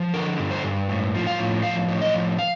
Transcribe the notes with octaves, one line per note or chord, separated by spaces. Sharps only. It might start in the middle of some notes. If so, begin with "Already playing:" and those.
Already playing: F3
D3 A#4
G2
C5
G2
A2
F3
F5
A2
F3 F5
A2
D#5
F3
F5